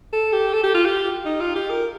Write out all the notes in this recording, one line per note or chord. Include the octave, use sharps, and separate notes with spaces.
A4
G4
A4
G4
F4
G4
D#4
F4
G4
A#4